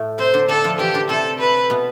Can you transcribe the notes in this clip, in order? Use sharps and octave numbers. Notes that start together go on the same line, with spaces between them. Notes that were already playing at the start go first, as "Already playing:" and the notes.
Already playing: A2 A3
C3 C4 C5
D3 D4
D3 D4 A4
F3 F4
E3 E4 G4
D3 D4
C3 C4 A4
B4
B2 B3